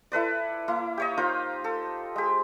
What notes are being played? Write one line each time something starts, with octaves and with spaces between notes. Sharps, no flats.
E4 A4 B4 D5
A#3 E4
G4 C#5 D#5
D#4 F4 A#4 C5
A4
G#3 G4